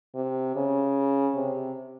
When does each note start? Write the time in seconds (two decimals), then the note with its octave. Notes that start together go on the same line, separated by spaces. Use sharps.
0.15 C3
0.56 C#3
1.36 C3